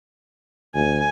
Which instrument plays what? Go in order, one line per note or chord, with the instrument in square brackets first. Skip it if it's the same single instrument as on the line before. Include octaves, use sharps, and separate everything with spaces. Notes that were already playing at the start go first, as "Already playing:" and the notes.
[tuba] D2 [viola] G#5